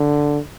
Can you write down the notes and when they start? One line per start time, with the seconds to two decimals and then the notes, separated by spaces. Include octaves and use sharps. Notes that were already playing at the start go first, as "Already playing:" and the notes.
Already playing: D3